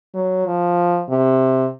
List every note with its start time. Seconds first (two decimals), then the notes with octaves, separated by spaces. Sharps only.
0.15 F#3
0.46 F3
1.10 C3